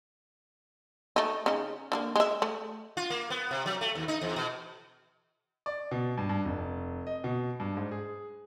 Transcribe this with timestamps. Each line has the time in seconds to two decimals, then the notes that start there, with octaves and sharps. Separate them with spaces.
1.16 A3 D#4
1.46 C#3 D#4
1.92 D3 F#3 A#3
2.16 G#3 E5
2.42 A3
2.97 F4
3.10 A#3
3.30 B3
3.51 C3
3.66 F#3
3.81 A3
3.95 D#2
4.08 D#4
4.21 E2
4.36 B2
5.66 D5
5.91 B2
6.18 G2
6.29 G2
6.45 F1
7.07 D#5
7.24 B2
7.60 G2
7.77 G#2
7.91 G#4